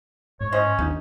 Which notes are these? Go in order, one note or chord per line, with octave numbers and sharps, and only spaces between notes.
G#2 C#5
C#4 C5 D#5
D#2 C4 D4 D#4